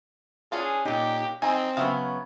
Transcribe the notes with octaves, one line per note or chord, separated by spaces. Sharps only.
C#4 D4 F4 G#4
A#2 D#4 G4
C4 D#4 G#5 A#5
C#3 F#3 B3 E5 F5